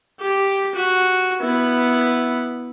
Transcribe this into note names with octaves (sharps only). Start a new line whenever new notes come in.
G4
F#4
B3 E4